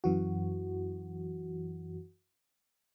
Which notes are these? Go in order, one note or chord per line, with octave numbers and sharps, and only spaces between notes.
F#2 E3 F#4